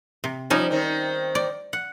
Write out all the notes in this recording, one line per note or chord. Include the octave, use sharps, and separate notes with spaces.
C3
F3 G3 C#4 D#4
D#3 C4
D5
F#5